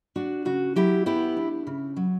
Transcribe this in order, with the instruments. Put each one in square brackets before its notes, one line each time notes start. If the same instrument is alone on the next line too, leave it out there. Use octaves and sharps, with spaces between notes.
[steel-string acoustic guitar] D4 F#4
C#3 F#4
F#3 E4 G4
B3 E4 G4
D4
C#3
F#3